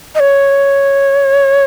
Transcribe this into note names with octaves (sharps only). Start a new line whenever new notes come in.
D#5
C#5